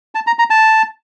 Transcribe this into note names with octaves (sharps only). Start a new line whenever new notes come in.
A5
A#5
A#5
A5